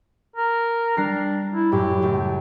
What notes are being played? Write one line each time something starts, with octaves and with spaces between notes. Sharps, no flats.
A#4
G3 D4 A#5 C7
E4
F#2 A2 G4
C#2 F#2 A3